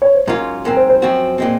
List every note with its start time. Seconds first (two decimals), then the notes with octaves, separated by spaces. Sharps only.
0.02 C#5
0.14 C5
0.27 G#2 F#3 C#4 F4 A#4
0.65 G#2 F#3 C4 A#4
0.76 C5
0.89 C5
1.02 F#2 F3 C4 F#4
1.38 A#2 G#3 C4